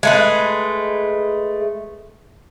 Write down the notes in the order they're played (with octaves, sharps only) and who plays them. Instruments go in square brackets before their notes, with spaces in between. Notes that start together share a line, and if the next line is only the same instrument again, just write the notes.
[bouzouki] G#3 A3 B4